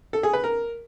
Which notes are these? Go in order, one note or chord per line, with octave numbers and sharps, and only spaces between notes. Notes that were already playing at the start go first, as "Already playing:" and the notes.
A4
G#4
B4
A#4